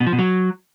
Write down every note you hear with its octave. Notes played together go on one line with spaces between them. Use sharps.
B2
F3
B2
F#3